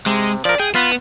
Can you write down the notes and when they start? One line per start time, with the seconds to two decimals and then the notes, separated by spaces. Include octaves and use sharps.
0.06 C3 G#3
0.45 F3 A#4 D5
0.60 G#4 G5
0.75 B3 F4 B4